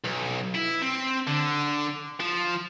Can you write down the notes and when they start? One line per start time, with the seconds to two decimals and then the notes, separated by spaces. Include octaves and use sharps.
0.04 B1
0.55 E4
0.82 C4
1.27 D3
2.20 F3